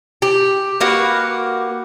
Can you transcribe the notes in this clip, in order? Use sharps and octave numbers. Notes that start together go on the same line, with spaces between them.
G4
A#3 F#4 G4 B4